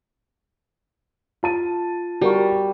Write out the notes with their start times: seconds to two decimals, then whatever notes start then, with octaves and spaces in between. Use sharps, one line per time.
1.43 F4 A5 D#7
2.21 G3 F#4 A#4 C#6